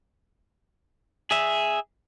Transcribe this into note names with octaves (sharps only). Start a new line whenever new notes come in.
G#4 E5